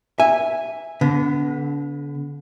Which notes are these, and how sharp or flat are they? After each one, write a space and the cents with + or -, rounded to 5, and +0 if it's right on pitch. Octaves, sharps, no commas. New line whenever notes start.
E5 +0 G#5 -10
D3 -35 B3 +0